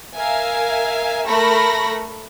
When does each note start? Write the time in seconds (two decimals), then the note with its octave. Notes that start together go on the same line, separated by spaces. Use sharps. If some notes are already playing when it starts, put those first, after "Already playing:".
0.15 A#4 E5 F5 G#5
1.26 A3 A#4 B5 C#6 A#6